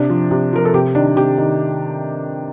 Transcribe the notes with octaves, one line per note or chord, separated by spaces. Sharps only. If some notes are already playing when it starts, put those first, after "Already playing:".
Already playing: C3 D4
F3
C3
F3 A#4
A4
C3 G4
D#3 D4
C3 G4
D#3